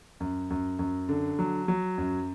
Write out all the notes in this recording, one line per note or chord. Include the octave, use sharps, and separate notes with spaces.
F#2
F#2
F#2
D3
F#3
F#3
F#2